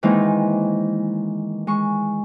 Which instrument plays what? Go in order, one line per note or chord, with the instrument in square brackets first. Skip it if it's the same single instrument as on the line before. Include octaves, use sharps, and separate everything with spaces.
[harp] D#3 E3 G#3 A#3 C4 D#4
G#3 C#6